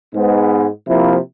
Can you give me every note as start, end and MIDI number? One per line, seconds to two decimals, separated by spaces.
0.14 0.67 44
0.14 0.67 59
0.88 1.16 48
0.88 1.16 53
0.88 1.16 58
0.88 1.16 64